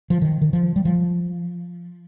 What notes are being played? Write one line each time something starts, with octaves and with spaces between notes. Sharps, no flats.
F3
D#3
D#3
F3
G3
F3